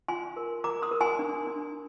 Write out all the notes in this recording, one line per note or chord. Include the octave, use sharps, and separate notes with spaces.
F4 G#5 C6
A#4
A#4 A#5 D6
C6 D#6
A#4
G#5 C6
D4
D4